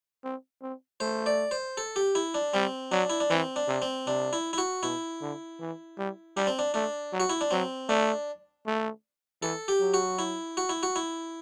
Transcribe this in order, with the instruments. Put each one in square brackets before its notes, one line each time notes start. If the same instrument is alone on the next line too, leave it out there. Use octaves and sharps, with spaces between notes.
[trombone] C4
C4
[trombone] A3 [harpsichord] C5
[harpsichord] D5
C5
A4
G4
E4
D4
[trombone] G3 [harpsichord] C4
[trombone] F#3 [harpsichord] D4
[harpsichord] E4
D4
[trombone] E3 [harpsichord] C4
[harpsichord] D4
[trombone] C3
[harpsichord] C4
[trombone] C3 [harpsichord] D4
[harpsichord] E4
E4
F#4
[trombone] B2 [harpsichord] E4
[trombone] D3
E3
G3
[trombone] G3 [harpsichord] D4
[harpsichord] C4
D4
[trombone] A3 [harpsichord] D4
[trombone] F#3
[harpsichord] F#4
E4
D4
[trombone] F#3 [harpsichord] C4
[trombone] A3 [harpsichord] D4
[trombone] A3
[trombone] E3 [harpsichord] A4
[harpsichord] G4
[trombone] F#3
[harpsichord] F#4
E4
F#4
E4
F#4
E4